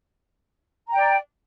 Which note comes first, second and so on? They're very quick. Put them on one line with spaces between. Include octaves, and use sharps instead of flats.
A#5 G5 D5